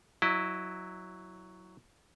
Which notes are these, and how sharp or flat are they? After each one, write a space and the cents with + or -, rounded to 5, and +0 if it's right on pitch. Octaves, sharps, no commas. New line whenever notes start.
F#3 +0 E4 +0 D#5 -25